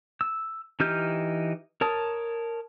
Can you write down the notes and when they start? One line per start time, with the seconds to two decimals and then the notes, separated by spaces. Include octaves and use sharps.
0.21 E6
0.80 E3 D#4 G4 F6 G6
1.81 A#4 C#5 A5 D#6